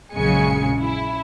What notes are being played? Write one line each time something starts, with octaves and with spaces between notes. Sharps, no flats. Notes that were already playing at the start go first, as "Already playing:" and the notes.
A#1 F#2 C#3 G#3 G#5 C#7
E4